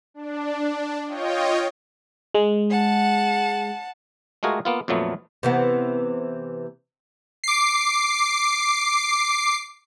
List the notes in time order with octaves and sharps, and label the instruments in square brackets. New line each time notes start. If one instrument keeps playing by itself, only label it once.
[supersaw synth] D4
F4 C#5 D#5 G5
[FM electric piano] G#3
[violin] F#5 A5
[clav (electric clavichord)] G#3 A3 F4 F#4 G#4 A#4
A#3 B3 F4
F2 A#2 F#3 A3 B3
[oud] C3 E3 B3
[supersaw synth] D6 C7